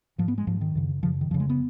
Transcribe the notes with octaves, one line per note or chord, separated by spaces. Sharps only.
G#2 F3
B3
G#3
G#2 F3
D#3
F#2 C#3
F#2 C#3 F3
D#3
F2 C#3 F3
G#3
B3